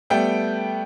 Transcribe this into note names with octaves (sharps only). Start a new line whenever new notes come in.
G3 A3 B3 G5